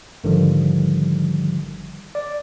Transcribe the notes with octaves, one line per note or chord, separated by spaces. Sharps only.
G#1 D3 D#3 F3 G3
D5